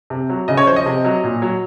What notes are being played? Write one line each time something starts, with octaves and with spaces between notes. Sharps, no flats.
C3
F#3
C#3 D#5
C#5
F3 C5
D#5
C3
F#3
A#2
F#3